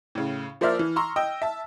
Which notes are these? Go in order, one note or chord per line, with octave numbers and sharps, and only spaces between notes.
A2 C#3
F3 A#3 C5 D5 E5 F6
E3
A#5 C6 C#6 E6
D#5 G5 E6
E5 A5